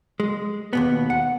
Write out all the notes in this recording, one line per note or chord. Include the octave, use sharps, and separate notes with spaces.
G#3
D#2 B2 B3
F#5